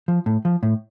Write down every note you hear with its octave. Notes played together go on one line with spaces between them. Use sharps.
F3
A2
F3
A2